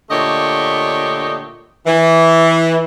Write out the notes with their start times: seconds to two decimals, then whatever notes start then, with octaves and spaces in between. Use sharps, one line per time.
0.11 A#2 D3 A3 G4 C#5 D#5
1.87 E3